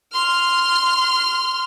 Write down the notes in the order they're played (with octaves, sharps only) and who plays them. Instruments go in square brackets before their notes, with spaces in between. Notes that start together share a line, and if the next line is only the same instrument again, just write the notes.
[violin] C6 F6